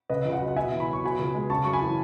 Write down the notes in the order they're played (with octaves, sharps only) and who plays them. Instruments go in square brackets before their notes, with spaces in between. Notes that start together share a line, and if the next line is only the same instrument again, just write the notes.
[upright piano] C#3 B4 D#5
C#2
D#5 F#5
F#3
F#5
B2 E5 G#5
E2
B5
F#3
C#6
B2 G#5 B5
C#2
G#3
C#3 A5 C#6
F#2 C#6
G#5 B5
E3